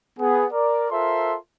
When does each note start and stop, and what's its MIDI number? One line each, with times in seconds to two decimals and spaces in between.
0.19 0.46 59
0.19 0.46 68
0.52 0.90 70
0.52 0.90 74
0.91 1.36 65
0.91 1.36 69
0.91 1.36 70
0.91 1.36 72
0.91 1.36 76
0.91 1.36 84